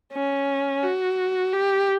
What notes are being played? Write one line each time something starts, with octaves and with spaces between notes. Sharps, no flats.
C#4
F#4
G4